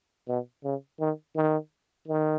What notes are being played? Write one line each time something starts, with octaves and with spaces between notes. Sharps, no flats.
B2
C#3
D#3
D#3
D#3